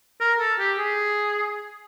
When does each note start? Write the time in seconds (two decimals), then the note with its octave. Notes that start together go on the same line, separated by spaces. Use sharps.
0.21 A#4
0.40 A4
0.59 G4
0.79 G#4